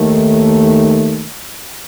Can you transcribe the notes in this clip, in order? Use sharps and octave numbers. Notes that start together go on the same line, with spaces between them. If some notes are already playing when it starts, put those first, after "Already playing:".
Already playing: D#2 D#3 A3